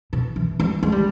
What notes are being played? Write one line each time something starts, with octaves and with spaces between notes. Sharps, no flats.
B2
E3
G3
G#3
G3